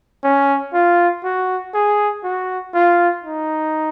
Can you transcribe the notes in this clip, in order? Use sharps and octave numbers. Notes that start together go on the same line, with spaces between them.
C#4
F4
F#4
G#4
F#4
F4
D#4